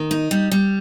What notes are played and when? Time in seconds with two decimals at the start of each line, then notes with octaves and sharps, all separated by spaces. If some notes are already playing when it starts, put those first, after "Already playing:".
Already playing: D#3
0.11 D#4
0.31 G3
0.52 G3